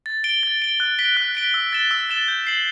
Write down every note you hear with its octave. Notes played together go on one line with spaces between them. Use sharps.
A6
D7 G7
A6
D7 G7
F#6
B6 D7 G7
F#6
B6 D7 G7
E6
A6 E7 G7
E6
A6 E7 G7
G6
C7 F#7